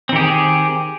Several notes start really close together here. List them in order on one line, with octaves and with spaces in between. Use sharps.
C4 D#3 G4 G#4